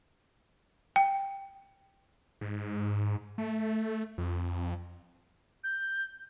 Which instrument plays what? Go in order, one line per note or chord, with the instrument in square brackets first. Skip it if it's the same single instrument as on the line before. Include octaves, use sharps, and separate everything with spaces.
[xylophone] G5
[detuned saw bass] G#2
A3
F2
[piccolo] G6